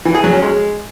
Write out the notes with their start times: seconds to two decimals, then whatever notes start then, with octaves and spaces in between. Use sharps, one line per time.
0.05 E3
0.15 G#4
0.24 F#3
0.33 C#4
0.42 G#3